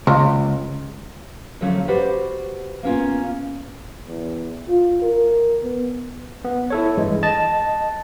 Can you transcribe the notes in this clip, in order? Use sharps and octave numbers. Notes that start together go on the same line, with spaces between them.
C#2
D3 F3 F#3 A3 C#4
F#4 G4 B4 C5 D5 F#5
A#3 B3 C#4 F4
E2
F4
A#4
B3
B3
E4 A4 C#5
G2 E3 G#3
D#5 A5 A6